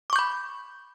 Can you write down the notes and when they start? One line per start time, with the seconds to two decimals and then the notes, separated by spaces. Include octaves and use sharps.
0.10 D6
0.13 C#6
0.16 G6
0.19 B5